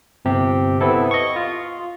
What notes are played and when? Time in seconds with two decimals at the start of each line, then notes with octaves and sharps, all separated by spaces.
0.25 G1 C3 G4
0.81 B3 C4 E4 A4
1.11 D#5 C#6
1.36 F4